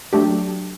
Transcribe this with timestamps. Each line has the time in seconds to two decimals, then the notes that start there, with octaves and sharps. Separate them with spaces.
0.13 F#3 A3 D4 G4